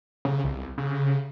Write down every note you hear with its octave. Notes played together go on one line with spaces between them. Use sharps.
C#3
C2
C#3